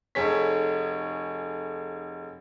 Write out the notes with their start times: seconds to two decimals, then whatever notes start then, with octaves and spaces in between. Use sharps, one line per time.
0.15 F1 G#4 A4 C#5 B6